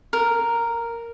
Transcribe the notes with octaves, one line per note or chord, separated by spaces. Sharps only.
A#4